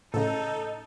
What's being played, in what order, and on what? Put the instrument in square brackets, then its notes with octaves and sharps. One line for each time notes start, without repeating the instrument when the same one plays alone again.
[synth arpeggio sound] A2 C#3 [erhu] D#4 [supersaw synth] A4